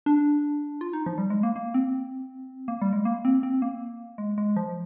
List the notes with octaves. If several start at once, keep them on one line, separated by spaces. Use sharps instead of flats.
D4
F4
D#4
F3
G3
G#3
A#3
A#3
C4
A#3
G3
G#3
A#3
C4
C4
A#3
G#3
G#3
F3